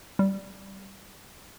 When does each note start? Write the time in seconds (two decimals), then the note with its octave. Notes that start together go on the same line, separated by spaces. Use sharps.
0.19 G3